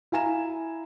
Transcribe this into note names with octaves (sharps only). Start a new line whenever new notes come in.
E4 F5 G#5 A#5 E7